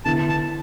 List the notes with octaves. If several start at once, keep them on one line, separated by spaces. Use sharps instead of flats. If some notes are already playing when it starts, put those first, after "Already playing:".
D3 B3 E4 A5
A5